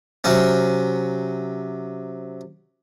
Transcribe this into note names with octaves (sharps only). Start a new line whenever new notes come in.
C3 F#3 C#4